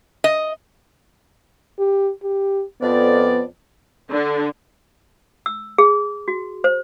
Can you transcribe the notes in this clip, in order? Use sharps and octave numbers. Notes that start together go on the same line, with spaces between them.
D#5
G4
G4
F2 B3 D5
D3
E6
G#4
F#4
C5